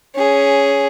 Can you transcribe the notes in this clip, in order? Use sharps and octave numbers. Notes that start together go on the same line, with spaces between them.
C#4 G#4